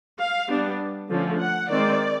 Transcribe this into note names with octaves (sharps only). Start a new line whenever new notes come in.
F5
G3 B3 D4
D3 F3 A3 C#4
F#5
D#3 G#3 C4 D5